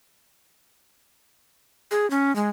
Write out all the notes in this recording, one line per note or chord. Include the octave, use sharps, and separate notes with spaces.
G#4
C#4
G#3